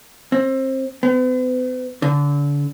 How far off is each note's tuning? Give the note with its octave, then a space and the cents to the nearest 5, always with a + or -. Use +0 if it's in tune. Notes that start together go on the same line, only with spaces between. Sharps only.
C4 +25
B3 +45
D3 -30